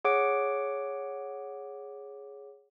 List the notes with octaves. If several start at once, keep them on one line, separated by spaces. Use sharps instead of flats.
G#4 C#5 F#5 D6 D7